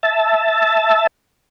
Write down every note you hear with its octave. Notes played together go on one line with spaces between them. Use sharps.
E5 A5